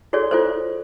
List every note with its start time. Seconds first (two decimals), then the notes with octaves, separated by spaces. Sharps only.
0.13 F#4 G#4 A4 C#5 D5
0.31 F4 A4 C5